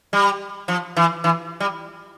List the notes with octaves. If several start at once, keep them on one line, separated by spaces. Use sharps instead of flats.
G3
F3
E3
E3
G3